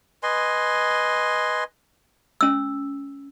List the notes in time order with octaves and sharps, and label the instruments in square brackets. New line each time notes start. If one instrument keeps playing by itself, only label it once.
[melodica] B4 D#5 G#5 C6
[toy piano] C#4 E6